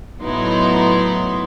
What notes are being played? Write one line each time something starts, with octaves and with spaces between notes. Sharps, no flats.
A2 F#3 B3 D#4 E4 C6